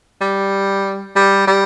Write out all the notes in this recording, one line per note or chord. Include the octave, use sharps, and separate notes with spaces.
G3
G3
G3